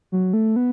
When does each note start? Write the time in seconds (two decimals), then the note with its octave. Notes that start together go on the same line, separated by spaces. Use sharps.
0.12 F#3
0.33 A3
0.56 B3